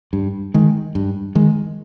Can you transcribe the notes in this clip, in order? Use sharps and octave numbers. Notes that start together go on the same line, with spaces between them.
G2
D#3 G#3
G2
D#3 G#3